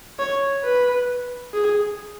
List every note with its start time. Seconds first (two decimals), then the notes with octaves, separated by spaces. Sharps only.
0.19 C#5
0.64 B4
1.53 G#4